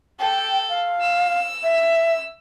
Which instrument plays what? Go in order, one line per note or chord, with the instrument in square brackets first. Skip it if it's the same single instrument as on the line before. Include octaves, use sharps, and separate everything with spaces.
[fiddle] A4 [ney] G5
[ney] F5
[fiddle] E6
[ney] E5